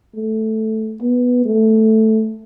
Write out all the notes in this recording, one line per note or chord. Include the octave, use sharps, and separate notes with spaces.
A3
B3
A3